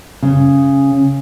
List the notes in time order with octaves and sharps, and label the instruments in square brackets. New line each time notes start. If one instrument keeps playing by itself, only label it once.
[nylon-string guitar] C#3